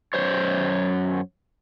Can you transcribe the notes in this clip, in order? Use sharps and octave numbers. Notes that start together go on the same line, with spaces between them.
F#2 C5 C#5